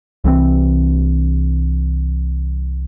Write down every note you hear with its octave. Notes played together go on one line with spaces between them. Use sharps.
C2 E3 F#3 C4